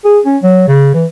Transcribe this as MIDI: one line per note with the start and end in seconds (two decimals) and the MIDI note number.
0.05 0.19 68
0.25 0.37 61
0.43 0.67 54
0.68 0.93 49
0.94 1.05 52